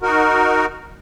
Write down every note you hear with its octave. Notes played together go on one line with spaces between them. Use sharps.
D#4 F#4 A#4